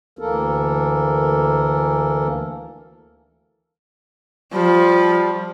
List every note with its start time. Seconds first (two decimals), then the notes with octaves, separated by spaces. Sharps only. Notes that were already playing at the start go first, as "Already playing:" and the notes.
0.19 D2 E3 A#3 A4 A#4
4.53 F3 G3